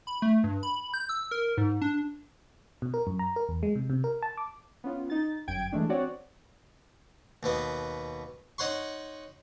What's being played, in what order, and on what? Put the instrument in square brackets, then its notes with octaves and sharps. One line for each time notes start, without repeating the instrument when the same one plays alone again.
[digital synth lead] B5
A3
G2
B5
G6
E6
A#4
G#2
D4
[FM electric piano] B2
A#4
F#2
A#5
A#4
E2
G#3
C3
C3
A#4
A5
D6
[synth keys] B3 C#4 F4
D#4 A6
G1 F#2 G5 G#6 D7
E3 G#3 A3 D4
C4 F#4 C#5 D5 F#5
[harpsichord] D#2 B2 B3
D#4 C#5 F#5 C6 C#6